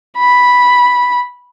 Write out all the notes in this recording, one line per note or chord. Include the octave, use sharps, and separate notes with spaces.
B5